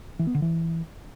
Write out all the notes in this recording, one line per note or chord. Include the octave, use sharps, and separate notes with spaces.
E3
B3
D3
E3